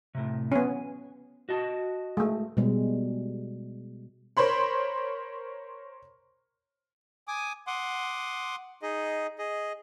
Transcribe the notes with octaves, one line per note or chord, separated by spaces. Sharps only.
A2 C3
B3 C#4 G#5
F#4 D#5 A5
G#3 A3
B2 G3 G#3
A#4 C5 C#5 B5 C6
G#5 D6 D#6
F#5 C6 D6 D#6
D#4 G#4 D#5
G#4 D#5